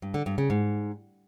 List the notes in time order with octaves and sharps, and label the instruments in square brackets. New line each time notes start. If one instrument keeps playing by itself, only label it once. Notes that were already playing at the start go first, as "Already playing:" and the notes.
[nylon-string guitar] G2
D3
G2
C#3
G#2